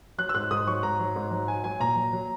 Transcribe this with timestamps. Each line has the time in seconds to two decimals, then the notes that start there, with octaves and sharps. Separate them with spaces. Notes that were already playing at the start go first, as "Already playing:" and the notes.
0.18 F#3 F#6
0.29 E6
0.34 G#2 F#6
0.51 G#2 D#6
0.67 F#3 C#6
0.83 G#2 A#5
1.00 F#3
1.16 G#2
1.31 F#3
1.48 F#3 G#5
1.64 F#3 G#5
1.80 A#2 A#5
1.96 F#3
2.13 F#3